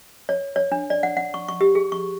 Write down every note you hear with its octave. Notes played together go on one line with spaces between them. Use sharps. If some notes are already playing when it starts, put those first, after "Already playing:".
C#5
C#5
D4
D5
F#5
F#5
C#6
C#6
G4
G#4
C#6